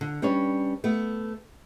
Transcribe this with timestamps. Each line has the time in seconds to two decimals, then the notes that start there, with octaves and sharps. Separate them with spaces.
0.01 D3
0.22 G3 C#4 D4 B4 C#5
0.84 A3 B3